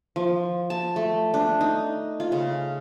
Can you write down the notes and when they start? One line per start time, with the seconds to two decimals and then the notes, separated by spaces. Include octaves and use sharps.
0.16 F3
0.70 A5
0.96 A3
1.34 D4
1.61 D#4
2.20 F4
2.32 C#3